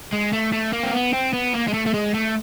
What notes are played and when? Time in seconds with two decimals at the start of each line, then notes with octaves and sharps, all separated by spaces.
0.13 G#3
0.33 A3
0.53 A3
0.73 A#3
0.83 C4
0.93 B3
1.13 C4
1.33 B3
1.53 A#3
1.68 G#3
1.74 A3
1.86 A3
1.94 G#3
2.14 A3